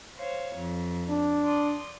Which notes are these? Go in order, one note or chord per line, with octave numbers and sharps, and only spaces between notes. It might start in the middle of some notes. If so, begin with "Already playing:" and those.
C5 C#5 F5
F2
D4
D5 C6 D#6